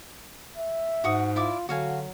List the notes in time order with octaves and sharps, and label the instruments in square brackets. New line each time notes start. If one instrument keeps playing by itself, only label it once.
[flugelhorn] E5
[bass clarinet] G#2 [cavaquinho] F#4 F#5 D#6
[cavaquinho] E4 D5 D6 [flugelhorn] F4
[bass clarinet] D3 [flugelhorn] F#3 [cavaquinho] F#4 F5 G#5